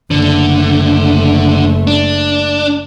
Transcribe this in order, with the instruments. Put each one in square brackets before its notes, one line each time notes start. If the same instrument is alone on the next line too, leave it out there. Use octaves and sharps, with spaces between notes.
[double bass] F#1 A3 [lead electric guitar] D3
[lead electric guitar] D4